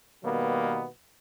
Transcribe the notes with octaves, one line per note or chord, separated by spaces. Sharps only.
B2 D#3 G3 A#3 B3